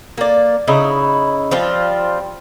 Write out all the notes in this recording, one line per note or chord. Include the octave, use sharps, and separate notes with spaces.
A#3 D5
C#3 D#4 E4
F3 G3 C4 F4